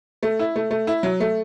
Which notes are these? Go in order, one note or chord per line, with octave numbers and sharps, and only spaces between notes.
A3
E4
A3
A3
E4
F#3
A3